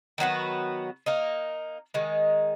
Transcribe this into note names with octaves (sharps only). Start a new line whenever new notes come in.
D#3 F#3 B3 F#4
A#3 D#4 A#4
D#3 G#3 D#4